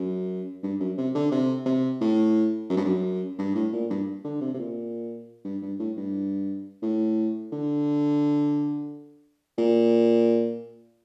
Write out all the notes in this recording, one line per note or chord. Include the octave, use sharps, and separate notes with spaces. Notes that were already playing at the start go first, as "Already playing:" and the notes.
Already playing: F#2
G2
F#2
C3
D3
C3
C3
A2
F#2
G2
F#2
G2
A2
A#2
G2
D3
C3
C3
A#2
G2
G2
A2
G2
A2
D3
A#2